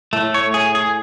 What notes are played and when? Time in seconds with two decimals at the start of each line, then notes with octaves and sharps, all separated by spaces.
0.13 A2 A3
0.34 C#5
0.54 G#4
0.75 G#4